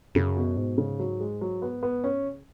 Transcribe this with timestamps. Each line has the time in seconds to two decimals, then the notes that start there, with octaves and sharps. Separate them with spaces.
0.15 F#2 C#3
0.36 B2
0.57 G#2 B2
0.78 C#3
0.99 F#3
1.20 G#3
1.41 F#3
1.62 B3
1.83 B3
2.04 C#4
2.25 B2
2.34 C#3